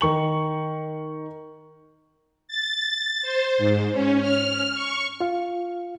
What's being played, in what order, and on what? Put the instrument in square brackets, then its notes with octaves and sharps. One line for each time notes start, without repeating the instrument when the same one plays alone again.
[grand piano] D#3 C#6 F#7
[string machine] A6
C5
G#2
C#4
F6
C#6
[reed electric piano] F4 F5